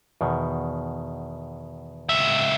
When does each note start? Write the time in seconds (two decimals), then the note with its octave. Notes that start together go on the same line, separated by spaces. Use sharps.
0.21 E2 B2 D#3
2.09 C#2 E5